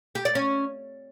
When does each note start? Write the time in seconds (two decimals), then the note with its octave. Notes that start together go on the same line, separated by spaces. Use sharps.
0.15 G4
0.25 D5
0.35 C#4